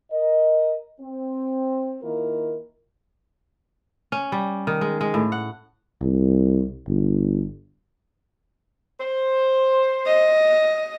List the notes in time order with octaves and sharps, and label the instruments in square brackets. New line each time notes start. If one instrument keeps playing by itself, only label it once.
[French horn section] A#4 D#5
C4
D#3 A#3 E4 F4 A#4
[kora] C#4
G3
D#3
G#3
G#3
A2
F#5
[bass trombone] C2
G1
[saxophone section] C5
[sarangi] D#5